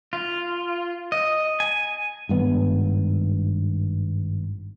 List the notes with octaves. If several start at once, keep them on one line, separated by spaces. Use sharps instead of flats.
F4
D#5
G#5
G#1 G2 B3